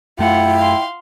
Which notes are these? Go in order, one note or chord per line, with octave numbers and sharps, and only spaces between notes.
F#2 A3 E4 F4 F#5 G5
F5 C6